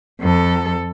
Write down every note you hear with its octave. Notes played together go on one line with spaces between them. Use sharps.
F2 A4